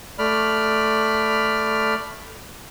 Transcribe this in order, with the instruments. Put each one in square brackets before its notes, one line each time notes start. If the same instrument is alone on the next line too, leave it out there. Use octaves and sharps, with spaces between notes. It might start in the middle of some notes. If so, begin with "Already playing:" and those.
[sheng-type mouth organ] A3 D5 B5 F6